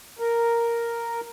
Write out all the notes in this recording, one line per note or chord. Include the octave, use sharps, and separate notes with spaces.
A#4